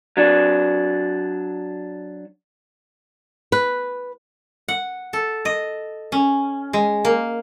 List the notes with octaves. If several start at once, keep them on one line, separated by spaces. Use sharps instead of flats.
F#3 D4
B4
F#5
A4
D#5
C#4
G#3
A#3